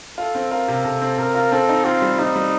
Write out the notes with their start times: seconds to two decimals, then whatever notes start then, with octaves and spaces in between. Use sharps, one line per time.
0.17 F4 A4
0.35 C4
0.51 F4 A#4
0.68 C3
0.85 C3 A4
1.01 C4
1.18 C3 A#4
1.35 F4
1.52 C4 A4
1.69 D#4
1.85 C4 F4
2.02 G3
2.19 G3 D#4
2.36 G3